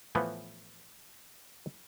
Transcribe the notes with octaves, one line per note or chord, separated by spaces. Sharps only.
A2 E3 F3 A3 B3